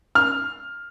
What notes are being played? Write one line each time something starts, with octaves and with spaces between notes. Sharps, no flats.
F6